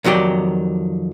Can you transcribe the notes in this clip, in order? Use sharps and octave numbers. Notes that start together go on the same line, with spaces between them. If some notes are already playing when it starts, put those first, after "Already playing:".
F2 D#3 F#3 G4 D5